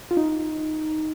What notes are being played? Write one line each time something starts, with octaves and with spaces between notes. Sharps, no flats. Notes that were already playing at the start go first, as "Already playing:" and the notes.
F4
D#4